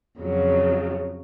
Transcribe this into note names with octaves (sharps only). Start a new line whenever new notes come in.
F2 C#3 F#3